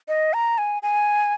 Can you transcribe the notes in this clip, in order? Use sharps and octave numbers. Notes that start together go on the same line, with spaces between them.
D#5
A#5
G#5
G#5